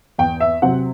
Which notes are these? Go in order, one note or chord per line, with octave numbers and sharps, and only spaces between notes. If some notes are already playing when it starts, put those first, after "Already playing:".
E2 G5
E5
C3 F#3 C4 F#5